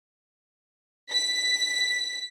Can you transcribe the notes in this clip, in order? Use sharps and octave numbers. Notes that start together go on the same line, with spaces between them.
B6